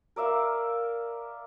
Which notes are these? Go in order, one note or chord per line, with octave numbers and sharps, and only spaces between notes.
A#4 D5 E5 F5